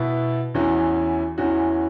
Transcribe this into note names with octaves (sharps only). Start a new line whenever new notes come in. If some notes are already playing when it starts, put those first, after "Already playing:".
Already playing: B2 B3 E4
E2 E3 C#4 F#4
E2 E3 C#4 F#4